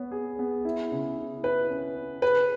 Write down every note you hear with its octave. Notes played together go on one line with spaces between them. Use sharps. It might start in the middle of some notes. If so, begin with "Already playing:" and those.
Already playing: B3 C#5
G#4
B3
E4
C#3
E4
E4 B4
C#4
C#4
G#4 B4